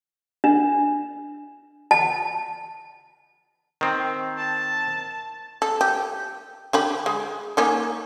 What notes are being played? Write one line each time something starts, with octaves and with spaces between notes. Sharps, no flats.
D4
A5
D#3 C4
A5
A4
G4
D3 G4 B5
G#3
A#3 C#4 D#4